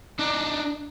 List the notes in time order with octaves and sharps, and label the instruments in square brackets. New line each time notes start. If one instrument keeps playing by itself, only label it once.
[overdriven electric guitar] D4 D#4